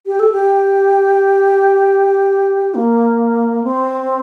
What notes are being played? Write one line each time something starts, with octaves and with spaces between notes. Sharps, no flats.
G4
A4
G4
A#3
C4